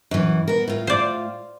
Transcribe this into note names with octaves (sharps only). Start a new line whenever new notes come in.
F#2 E3
B3 A#4
A2 F4
C5 D5